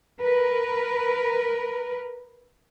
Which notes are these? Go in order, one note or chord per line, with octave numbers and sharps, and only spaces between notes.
A#4 B4